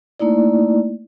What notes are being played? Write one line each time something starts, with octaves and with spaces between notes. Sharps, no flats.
A3 A#3 D#4 E4 D5